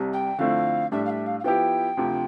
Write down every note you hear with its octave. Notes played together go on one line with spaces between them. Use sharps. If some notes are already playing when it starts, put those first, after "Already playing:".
Already playing: C2 C3 G3
G5
D3 F3 A3 C4 E4 F5
A2 G3 D4 E5
F5
E5
F5
F5
F3 B3 E4 G4 G5
D2 C3 F3